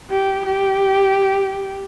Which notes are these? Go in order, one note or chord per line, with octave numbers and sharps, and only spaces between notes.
G4
G4